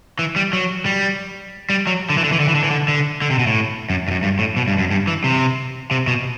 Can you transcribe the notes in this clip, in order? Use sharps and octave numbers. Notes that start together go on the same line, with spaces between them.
E3
G3
F#3
G3
G3
F#3
D3
E3
D3
E3
D3
E3
D3
E3
D3
D3
D3
C3
B2
A2
F#2
G2
F#2
G2
A2
B2
G2
F#2
G2
E3
C3
C3
B2